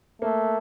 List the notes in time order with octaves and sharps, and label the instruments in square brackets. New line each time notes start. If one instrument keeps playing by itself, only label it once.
[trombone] A3 [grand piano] A#3